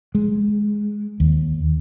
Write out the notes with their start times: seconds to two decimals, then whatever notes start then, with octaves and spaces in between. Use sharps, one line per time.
0.15 G#3
1.20 D#2